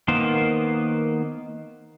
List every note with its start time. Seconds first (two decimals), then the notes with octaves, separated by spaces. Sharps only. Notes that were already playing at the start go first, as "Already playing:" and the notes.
0.08 D#3 A#3 B3 C5